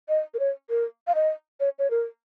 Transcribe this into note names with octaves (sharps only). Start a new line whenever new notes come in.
D#5
A#4
C#5
A#4
F5
D#5
C#5
C#5
A#4